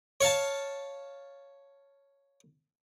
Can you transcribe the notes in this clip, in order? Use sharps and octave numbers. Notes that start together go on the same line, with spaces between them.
C#5 F5 A5